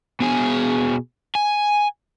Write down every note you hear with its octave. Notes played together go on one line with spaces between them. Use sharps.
B2 G#4
G#5